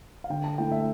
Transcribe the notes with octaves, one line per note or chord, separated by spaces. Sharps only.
F5
D3 G5
A5
A3 E4 G5
E5